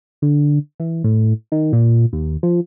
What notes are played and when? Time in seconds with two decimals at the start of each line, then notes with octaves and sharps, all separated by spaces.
0.22 D3
0.80 E3
1.04 A2
1.52 D#3
1.73 A#2
2.13 D#2
2.43 F3